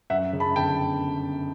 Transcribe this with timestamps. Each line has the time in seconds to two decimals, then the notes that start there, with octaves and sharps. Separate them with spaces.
0.10 F#2 E5 F#5
0.33 C#3
0.40 A5 B5
0.56 G1 G5 A5